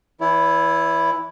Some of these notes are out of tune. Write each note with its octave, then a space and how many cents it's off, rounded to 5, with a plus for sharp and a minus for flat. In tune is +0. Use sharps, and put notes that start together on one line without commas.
E3 +0 E4 +0 C#5 +40